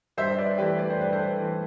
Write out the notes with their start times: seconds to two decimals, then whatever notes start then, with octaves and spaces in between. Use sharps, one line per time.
0.17 G2 C5 E5
0.38 B4 D5
0.58 E3 A3 G4 B4
0.79 D5
0.90 C5
1.00 G2 B4
1.12 A4 C5
1.40 E3 A3